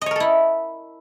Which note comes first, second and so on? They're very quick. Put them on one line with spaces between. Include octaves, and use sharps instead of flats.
D#5 C#5 A#4 A4 E4